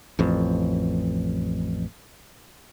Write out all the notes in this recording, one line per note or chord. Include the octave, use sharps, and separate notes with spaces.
A1 F2